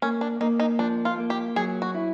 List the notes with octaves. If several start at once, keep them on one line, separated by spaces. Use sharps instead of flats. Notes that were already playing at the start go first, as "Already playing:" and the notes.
A#3 C#4
D4
A#3 D#4
D#4
F3 D4
F4
A#3
G4
F#3 G#4
F#4
E4